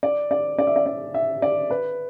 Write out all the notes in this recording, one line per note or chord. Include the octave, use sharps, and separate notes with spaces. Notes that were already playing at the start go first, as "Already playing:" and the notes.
D5
D5
D5
E5
D5
D5
E5
D5
B4